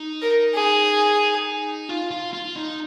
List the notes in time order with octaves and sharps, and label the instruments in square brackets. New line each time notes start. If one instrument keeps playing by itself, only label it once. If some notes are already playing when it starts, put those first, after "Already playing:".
Already playing: [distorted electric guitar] D#4
[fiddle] A#4
G#4
[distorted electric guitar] F4
F4
F4
D#4